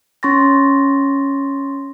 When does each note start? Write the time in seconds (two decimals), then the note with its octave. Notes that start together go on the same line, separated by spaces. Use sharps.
0.23 C#4 C6 C#6 A6 A#6